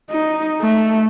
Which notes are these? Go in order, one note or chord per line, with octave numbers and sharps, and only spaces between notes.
D#4
A3